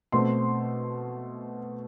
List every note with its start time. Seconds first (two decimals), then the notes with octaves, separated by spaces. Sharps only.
0.12 B2 A3 C4 C6